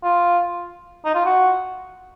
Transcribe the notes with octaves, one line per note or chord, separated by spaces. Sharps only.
F4
D#4
F4
F#4